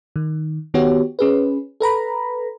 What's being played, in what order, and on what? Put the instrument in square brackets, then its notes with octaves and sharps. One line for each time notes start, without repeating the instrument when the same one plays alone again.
[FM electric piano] D#3
D#3 B3 F#4 G4 C#5
C#4 G#4 B4
A4 B4 A#5 B5